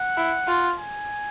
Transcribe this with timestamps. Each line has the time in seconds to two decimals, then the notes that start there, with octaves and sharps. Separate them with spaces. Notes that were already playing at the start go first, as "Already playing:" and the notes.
Already playing: F#5
0.17 E4
0.47 F4
0.79 G#5